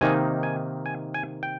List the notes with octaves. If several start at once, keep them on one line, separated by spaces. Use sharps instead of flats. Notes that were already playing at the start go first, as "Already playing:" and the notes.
C3 D#3 A#3 D#4 G#5
G#5
G#5
G#5
G5